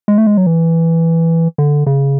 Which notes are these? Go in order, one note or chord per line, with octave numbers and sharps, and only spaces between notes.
G#3
A3
G#3
F#3
E3
D3
C#3